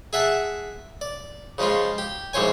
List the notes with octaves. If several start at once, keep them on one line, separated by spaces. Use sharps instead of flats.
G#4 E5 F#5 A5
D5
C#3 F3 G#3 C#4 F4
G4
C2 G#2 F3 C5 C#5 G#5